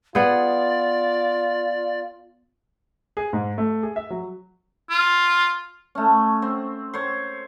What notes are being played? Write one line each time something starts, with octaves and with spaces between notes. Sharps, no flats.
B3 F4 G#4 D5
G#4
G#2
A3
G#4
E5
F#3
F4
A3 C#4
C4
C5 C#5